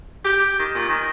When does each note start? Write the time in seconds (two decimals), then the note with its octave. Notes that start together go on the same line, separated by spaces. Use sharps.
0.25 G4
0.59 D#3
0.75 A#2
0.89 D#3